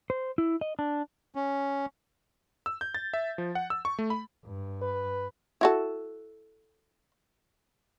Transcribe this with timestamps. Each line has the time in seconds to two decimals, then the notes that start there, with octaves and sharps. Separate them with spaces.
0.10 C5
0.38 E4
0.61 D#5
0.79 D4
1.35 C#4
2.66 E6
2.81 G6
2.95 A6
3.13 E5
3.38 F3
3.55 F#5
3.70 E6
3.85 C#6
3.99 A3
4.10 B5
4.45 G2
4.82 B4
5.61 E4 F#4 A4